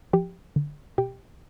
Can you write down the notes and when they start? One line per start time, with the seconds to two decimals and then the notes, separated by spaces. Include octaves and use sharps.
0.13 F3 G4 G5
0.56 D3
0.98 B2 G4 G5